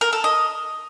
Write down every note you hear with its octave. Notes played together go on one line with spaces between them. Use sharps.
A#4
A4
D#5